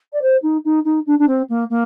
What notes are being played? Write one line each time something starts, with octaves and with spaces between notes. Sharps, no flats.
D5
C5
D#4
D#4
D#4
D4
D4
C4
A#3
A#3